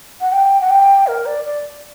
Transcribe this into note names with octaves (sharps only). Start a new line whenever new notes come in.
F#5
G5
F#5
G5
A#4
D5
D5